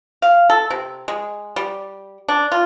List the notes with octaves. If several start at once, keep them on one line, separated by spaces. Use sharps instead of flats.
F5
A4
C3
G#3
G3
D4
F4